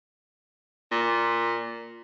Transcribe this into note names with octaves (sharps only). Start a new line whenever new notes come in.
A#2